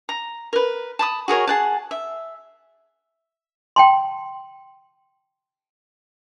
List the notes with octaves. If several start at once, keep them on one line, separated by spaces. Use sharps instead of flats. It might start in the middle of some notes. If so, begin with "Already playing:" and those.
A#5
A#4 B4
A5 B5 D#6
F#4 G#4 A#4 C#5
G#4 F#5 A5
E5
G5 A5 C6